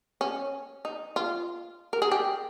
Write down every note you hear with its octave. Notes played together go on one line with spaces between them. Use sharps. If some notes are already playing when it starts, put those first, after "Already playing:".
C#4
D#4
F4
A#4
G#4
G4